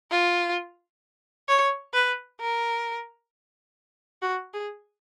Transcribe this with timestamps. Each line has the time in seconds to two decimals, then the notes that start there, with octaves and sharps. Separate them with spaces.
0.11 F4
1.48 C#5
1.93 B4
2.40 A#4
4.22 F#4
4.53 G#4